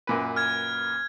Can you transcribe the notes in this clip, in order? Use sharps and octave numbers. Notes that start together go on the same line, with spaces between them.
F#2 A#2 B4
F6 G#6